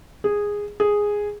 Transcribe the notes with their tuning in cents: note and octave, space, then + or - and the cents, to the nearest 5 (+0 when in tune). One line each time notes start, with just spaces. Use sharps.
G#4 -10
G#4 -5